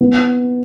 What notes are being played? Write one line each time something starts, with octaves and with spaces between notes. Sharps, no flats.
B3